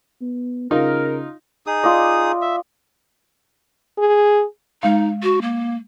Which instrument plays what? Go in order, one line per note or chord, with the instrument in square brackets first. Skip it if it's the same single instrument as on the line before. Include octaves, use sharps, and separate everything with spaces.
[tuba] B3
[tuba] C#3 [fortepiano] D#4 F4 [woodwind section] A#4
[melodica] D#4 G#4 D#6
[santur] F4 D5 D#5
[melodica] E5
[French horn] G#4
[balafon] G#3 F5 [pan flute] D#4
[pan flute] F#4
A#3